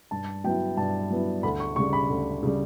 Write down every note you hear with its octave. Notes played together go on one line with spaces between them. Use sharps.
G2 A5
F#3 B3 E4 G5
G2 A5
F#3 B3 E4
D2 B5
C#6
C#3 G3 C#6
B5
D2
C#3 G3